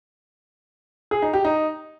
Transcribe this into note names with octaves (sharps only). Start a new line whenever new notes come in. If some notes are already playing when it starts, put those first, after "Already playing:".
G#4
D#4
G4
D#4